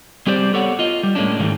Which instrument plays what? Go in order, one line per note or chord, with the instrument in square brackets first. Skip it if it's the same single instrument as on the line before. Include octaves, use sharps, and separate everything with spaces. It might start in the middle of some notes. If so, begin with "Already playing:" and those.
[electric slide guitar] G3 C4 G4 G#4 C5 D5
B3 G4 A4 C#5 D5 F#5
F4 D#5
G3
A2 G#3 A#3 C#4 D4
G#2 D#3 E3 G3 A3